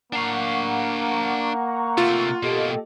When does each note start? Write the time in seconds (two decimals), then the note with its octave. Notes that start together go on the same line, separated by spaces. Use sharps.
0.13 A#3 D4 F5 F#5 A#5 C#6
1.98 C3 A3 F4
2.43 B2 A#3 G4 A4 D#5